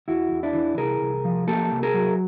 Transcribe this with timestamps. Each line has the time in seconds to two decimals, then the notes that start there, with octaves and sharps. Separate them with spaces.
0.08 E2 E4 F#4
0.31 E2
0.43 D4 E4
0.54 E3
0.77 C2 G#4 A#4
1.01 C2
1.25 F3
1.47 A#3 G4 A4
1.71 C2
1.83 G#4 A#4
1.94 F#3